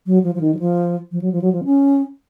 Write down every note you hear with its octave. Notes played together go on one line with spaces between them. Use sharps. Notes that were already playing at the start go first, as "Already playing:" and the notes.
F#3
F3
F3
D#3
F#3
F3
F3
F#3
F3
F#3
F3
C#4